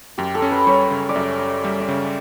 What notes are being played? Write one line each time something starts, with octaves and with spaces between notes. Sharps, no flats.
F#2 G4
A4
C#4
B4
G3 C#5
C#3
D5
F#2 E5
C#4
G3 E5
D5
C#3